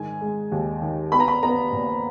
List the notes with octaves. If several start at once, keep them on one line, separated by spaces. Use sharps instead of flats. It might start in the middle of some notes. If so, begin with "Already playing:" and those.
Already playing: G#2 D#3 G#5
G#3
D#2
D#3
B3 B5
A#5
B5
B3 A#5
A#2